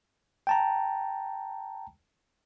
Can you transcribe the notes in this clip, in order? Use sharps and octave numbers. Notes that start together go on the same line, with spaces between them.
G5 A5 A#5